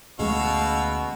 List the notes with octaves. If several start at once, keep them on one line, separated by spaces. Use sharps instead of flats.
D2 B2 G#3 A3 C#4 F5 C#6 E6